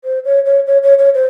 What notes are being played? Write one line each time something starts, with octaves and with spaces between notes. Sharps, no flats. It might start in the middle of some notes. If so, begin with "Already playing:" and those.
C5
C#5
C#5
C#5
C#5
C#5
C5